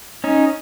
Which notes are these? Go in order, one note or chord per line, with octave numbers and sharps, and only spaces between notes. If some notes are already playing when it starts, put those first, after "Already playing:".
C#4 D#4